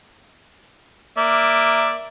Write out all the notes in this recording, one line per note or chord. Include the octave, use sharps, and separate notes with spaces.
A#3 D5 E5